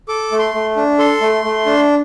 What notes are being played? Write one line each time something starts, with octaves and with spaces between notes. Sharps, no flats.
A4 D6
A3
C6
A3
D4
A4 C6
A3
A3
D4